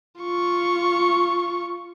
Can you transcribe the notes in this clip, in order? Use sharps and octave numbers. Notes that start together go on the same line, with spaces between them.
F4 C#6